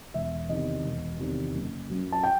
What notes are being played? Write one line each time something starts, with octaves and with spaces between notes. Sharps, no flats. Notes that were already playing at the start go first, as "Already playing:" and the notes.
E1 E5
E2 C3 D#3 D#5
E1
E2 C3 D#3
F#1
F#2 F#3
A5
G5